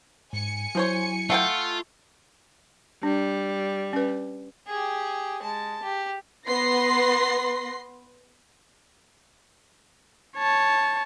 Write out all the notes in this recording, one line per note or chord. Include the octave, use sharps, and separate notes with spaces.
G#2 G#5 C#7
F3 F#3 E4 C5 C#5
A3 F4 F#5 G5
G3 D4
C#4 B4
G4 G#4
G#3 A5
G4
B3 B4 C6 A#6 C7
C#5 A5